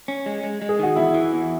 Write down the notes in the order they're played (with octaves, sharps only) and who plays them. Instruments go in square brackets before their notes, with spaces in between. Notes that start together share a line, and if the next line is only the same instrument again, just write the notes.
[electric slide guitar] C#4
G#3
G#3
G#3
[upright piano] G#4
[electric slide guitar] D#3 [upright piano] F#4
[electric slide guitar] E2 [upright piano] E4
[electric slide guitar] E3
E2